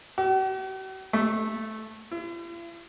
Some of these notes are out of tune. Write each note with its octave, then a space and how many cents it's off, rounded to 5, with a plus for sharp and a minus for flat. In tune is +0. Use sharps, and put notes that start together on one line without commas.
F#4 +45
A3 -10
E4 +45